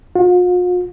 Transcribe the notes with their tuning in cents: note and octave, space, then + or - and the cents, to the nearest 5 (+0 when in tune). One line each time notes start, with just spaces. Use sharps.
F4 +45